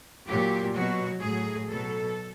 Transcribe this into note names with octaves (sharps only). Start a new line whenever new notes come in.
A#2 F#3 G4
B2 F#3 F#4
A2 F#3 G#4
B2 F#3 A4